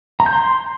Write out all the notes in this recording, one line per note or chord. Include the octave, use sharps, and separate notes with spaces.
A#5
G6
C6